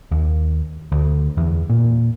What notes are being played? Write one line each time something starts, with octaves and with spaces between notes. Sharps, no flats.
D#2
D2
E2
A#2